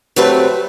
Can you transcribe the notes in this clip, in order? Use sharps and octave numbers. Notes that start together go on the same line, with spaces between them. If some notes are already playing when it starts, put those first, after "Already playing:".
C3 F#3 A3 C4 B4